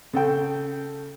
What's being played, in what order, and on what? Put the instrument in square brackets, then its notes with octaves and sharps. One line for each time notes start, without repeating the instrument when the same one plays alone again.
[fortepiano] C#3 A4 G5